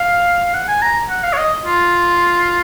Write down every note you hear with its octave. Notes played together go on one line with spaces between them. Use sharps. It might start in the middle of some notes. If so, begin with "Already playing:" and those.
Already playing: F5
F#5
G#5
A#5
F#5
F5
C#5
D#5
F4